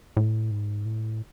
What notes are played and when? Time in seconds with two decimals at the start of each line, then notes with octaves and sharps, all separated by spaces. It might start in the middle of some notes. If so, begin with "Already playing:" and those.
0.17 A2
0.51 G#2
0.86 A2